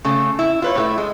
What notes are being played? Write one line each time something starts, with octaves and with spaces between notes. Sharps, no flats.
C#3 A3
E4
F4 B4 C#5
A2 A3 E4
G#3